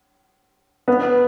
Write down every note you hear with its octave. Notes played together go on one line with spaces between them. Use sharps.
B3